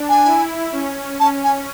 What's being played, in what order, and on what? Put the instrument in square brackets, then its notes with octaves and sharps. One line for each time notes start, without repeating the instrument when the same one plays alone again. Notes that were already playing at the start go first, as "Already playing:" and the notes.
Already playing: [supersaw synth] D4
[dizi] G#5
[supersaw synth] E4
C#4
[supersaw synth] C#4 [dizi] A5
[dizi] G#5